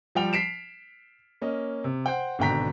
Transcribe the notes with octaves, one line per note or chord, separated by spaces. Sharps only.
F3 G3 G5 F7
B6 C7 D7 E7
A#3 C#4 D#5
C3
C5 F#5 G5
G#1 B2 D3 G5 A#5 B6